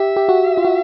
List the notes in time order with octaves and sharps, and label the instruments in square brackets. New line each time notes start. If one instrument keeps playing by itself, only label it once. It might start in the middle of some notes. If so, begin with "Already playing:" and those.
Already playing: [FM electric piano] G4 [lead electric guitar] E5
[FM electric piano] G4
F#4
F4
F#4